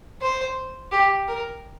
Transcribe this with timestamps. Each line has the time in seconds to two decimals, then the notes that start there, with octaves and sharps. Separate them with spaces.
0.22 C5
0.92 G4
1.28 A#4